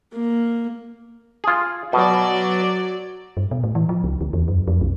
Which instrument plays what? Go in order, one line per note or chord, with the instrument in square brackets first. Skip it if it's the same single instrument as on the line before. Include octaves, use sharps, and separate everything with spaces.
[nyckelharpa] A#3
[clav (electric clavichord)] F4 G#4
[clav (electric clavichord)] B2 [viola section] F#3 D5
[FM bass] G2
B2
A2
E3
F3
C#2
D2
E2
F#2
F2
B1